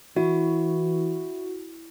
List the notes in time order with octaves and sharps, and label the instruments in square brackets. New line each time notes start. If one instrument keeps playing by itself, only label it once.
[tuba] E3 [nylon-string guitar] E4 [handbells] F#4